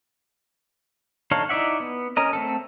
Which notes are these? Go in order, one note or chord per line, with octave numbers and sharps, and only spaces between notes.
D4 D#4 A4 C#5 F5
D#4 E4 D5 E5 F#5
B3
C#4 A#4 D#5
A3 C4 A4